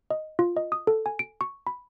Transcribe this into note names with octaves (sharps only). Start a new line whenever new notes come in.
D#5
F4
D#5
D#6
A4
G#5
D7
C#6
B5